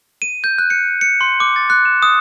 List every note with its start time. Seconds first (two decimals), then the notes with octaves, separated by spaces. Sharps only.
0.22 D#7
0.44 G6
0.58 F#6
0.70 C#7
1.01 C#7
1.21 C6
1.40 D6
1.56 A6
1.70 F#6
1.85 E7
2.02 D#6